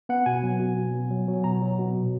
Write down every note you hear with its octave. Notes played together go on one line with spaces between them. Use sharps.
B3 F#5
B2 G#5
F#3
B2
B2
B3
F#3
F#3
B2 A#5
F#3
B2
A#2